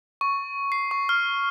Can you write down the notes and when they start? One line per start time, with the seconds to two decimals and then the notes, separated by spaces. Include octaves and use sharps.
0.21 C#6
0.72 C7
0.91 C#6
1.09 F6